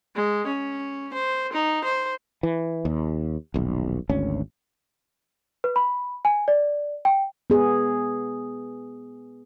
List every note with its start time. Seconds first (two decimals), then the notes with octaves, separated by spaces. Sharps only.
0.15 G#3
0.47 C#4
1.13 C5
1.53 D#4
1.84 C5
2.43 E3
2.85 D#2
3.54 D#1 B1
4.09 G#1 D2 C#4
5.64 B4
5.76 B5
6.25 G#5
6.48 D5
7.05 G5
7.50 B3 G#4